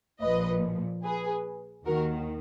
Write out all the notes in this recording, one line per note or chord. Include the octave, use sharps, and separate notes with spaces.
A#1 A#2 F3 B4 D#5
G#4 B4
D#2 D#3 F#4 A#4